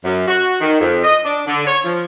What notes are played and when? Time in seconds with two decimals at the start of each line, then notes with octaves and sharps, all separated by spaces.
0.05 F#2
0.27 F#4
0.61 D#3
0.79 F2
1.04 D#5
1.25 D4
1.46 D3
1.67 C#5
1.85 F3